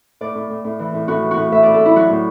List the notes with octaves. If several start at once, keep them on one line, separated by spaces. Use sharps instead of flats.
A2 D5
A2
A2
A2
E3
A2
A2 F#4
E3
F#4
A2
A2 E5
A2 D5
A4
A2 E4
F#3 F#4
A2